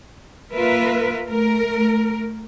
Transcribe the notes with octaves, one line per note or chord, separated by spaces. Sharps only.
A#3 F4 A#4 B4 E5
A3 A#4